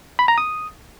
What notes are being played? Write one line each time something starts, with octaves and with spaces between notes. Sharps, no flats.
B5
A#5
D#6